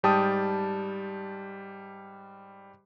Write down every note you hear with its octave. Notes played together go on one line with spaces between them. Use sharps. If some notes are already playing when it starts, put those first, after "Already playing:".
G#2 G3 G5 A5 D#6